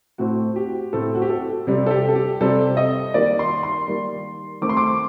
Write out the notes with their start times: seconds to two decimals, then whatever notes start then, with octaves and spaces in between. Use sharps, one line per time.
0.18 A2 A3 C4 F#4
0.56 G4
0.93 A2 A3 C4 A4
1.15 F#4
1.22 G4
1.29 A4
1.67 C3 G3 C4
1.86 A4
1.91 G4
2.09 A4
2.15 G4
2.41 C3 G3 C4 A4
2.77 D#5
3.14 D#3 G3 A#3 D5
3.39 C6
3.63 C6
3.88 D#3 G3 A#3
4.61 D#3 A3 C4 D6
4.69 C6
4.77 D6